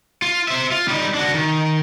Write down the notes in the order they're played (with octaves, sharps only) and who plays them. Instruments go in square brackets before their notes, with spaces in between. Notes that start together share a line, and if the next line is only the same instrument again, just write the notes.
[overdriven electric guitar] F4
C5 E5
F4
G3 D#4
D4 F#4
D#3